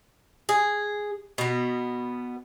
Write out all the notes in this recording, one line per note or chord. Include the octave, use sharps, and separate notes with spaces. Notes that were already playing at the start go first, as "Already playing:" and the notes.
G#4
B2 B3